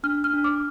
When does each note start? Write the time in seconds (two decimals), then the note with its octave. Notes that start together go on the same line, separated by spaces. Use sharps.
0.03 D4 F6
0.24 F6
0.33 D4
0.44 D6